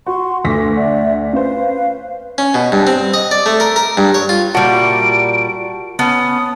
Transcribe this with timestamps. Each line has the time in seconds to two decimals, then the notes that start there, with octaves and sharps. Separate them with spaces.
0.07 F#4 F#5 C6 C#6
0.44 D2 A4 B4 D6 A#6 B6
0.75 D5 E5 F#5
1.33 C#4 B4 C5 F5
2.38 C#4
2.54 B2
2.72 G2
2.87 C4
3.14 D#5
3.31 D5
3.46 A3
3.60 A#4
3.76 A#4
3.97 G2
4.14 C#5
4.29 F4
4.55 A#2 G3 E4 F#4 A5 D7
5.99 B3 C#4 A5 D#6